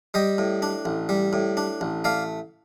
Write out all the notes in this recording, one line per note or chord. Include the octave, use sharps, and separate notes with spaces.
G3 D#5 G5
A2
D4
A1
G3
A2
D4
A1
A3 D5 F5